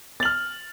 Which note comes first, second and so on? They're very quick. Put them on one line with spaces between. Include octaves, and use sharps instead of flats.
A6 F#7 F6